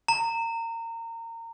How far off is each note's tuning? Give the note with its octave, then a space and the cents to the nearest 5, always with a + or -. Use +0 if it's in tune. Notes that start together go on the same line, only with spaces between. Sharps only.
A#5 -25